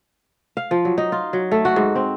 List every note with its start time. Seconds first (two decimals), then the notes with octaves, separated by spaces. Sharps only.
0.57 F5
0.71 F3
0.85 F#3
0.98 D#4
1.12 F4
1.33 F#3
1.52 A3
1.65 F#4
1.76 G#2
1.95 C4